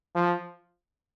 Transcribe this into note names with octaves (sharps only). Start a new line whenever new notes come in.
F3